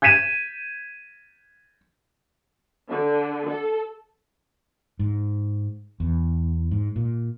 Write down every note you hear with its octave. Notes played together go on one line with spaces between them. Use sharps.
G6 G#6 B6 D#7 E7
D3
A4
G#2
E2
G#2
A#2